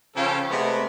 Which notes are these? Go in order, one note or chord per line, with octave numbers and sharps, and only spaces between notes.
C#3 F3 C#4 F4 G4 A4
C3 G#3 A3 B3